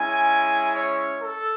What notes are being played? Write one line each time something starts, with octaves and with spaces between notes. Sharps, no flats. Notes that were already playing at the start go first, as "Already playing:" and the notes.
Already playing: G#3 C#4 E4 G#5
C#5
A4